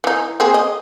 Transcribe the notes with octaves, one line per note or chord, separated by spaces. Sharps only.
E3 D#4
A#3 C4 G#4
D#5